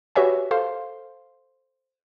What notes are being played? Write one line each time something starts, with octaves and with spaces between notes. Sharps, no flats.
F#4 G4 B4 C#5 E5 G#5
A4 C5 F5 C6